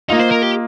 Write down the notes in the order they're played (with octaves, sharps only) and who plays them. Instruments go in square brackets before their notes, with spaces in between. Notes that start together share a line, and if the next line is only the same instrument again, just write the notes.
[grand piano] A#3 F4 D#5 [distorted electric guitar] D#4
[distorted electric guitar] C5
A#4
G4